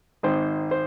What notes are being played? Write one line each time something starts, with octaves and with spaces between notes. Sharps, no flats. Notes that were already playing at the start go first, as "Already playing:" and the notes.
G#1 G#2 D#3 C5
C5